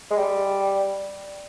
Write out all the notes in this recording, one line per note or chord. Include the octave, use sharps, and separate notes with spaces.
G#3
G3